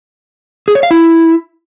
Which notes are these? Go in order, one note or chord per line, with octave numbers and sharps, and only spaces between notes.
G#4
C#5
F5
E4